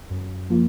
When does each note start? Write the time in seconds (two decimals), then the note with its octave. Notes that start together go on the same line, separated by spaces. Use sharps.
0.11 F#2
0.50 F3 A#3 F4